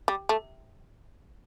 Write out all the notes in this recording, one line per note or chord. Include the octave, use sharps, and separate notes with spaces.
G3
A3